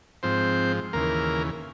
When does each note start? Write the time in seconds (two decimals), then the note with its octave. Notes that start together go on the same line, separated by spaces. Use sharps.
0.23 G#2 F3 C4 C5
0.93 D#2 C#3 E3 A#3 A#4